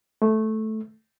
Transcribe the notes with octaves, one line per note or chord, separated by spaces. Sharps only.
A3